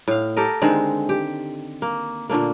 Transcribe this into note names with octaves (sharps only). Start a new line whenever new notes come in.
A2 F5
G4 A4 A#4 D#5
D3 D#3 G#3 C4
G4
A#3
A#2 D3 A3 A#3